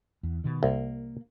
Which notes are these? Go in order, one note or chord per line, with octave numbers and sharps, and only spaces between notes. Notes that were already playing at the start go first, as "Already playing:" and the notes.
E2
B2 D#3
C2 A#3